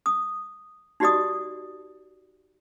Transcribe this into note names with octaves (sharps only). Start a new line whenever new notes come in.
D#6
D#4 F#4 G4 D5 D#5 D#6